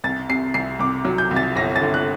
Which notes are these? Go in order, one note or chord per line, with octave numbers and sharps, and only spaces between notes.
C2 A6
C3 C7
C2 C7
C2 D6
F#3
G6
C2
A6
G1 A#6
A6
D3
F#6